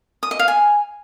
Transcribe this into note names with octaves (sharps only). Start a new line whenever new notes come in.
D#6
D#5
F5
G#5